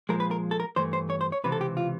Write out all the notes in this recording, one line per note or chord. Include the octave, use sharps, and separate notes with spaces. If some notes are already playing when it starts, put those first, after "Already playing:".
A#2 F3 G#3 A#4
B4
A#4
A4
A#4
G2 E3 A3 C5
C5
C#5
C5
C#5
C#2 C3 E3 B4
A4
G4
F4